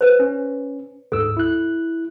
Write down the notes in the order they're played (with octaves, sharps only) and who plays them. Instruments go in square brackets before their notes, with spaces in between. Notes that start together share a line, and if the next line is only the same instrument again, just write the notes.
[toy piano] B4 C5
[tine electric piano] C#4
[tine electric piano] D2 G#2 E6 [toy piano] A4
[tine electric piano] E4 F#6